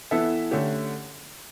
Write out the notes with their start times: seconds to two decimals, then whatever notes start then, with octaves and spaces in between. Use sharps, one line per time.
0.11 E3 B3 E4 A4 E5
0.51 D3 A3 C#4 G4